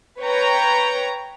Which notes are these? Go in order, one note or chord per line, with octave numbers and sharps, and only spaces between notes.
B4 C#5 G5 A#5